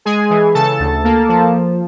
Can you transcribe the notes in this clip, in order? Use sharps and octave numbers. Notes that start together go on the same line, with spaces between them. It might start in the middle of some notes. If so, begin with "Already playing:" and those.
G#3 G#4 G#5
E3
C#3 A4 A5
D2
A#3
F3